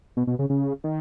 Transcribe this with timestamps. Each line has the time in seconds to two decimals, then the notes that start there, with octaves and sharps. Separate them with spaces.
0.17 B2
0.27 B2
0.39 C#3
0.50 C#3
0.84 D#3